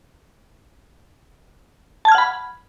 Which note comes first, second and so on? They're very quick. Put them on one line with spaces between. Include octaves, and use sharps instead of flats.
A5 G#6 F6 F#5 B5